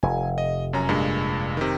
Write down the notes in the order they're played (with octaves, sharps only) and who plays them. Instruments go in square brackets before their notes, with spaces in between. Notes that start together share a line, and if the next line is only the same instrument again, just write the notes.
[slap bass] F1 [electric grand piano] G#5
[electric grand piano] D#5
F#2 C#4 A#5
G2 A#2 G#3
C3 D#3